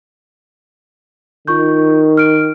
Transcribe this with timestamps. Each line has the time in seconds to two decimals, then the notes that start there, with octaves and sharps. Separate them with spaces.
1.47 D#3 F4 C#6 G6
2.17 F6 D7